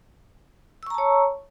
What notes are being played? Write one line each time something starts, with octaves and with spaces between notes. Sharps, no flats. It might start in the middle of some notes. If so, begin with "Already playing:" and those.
C#5 A5 A#5 C#6 E6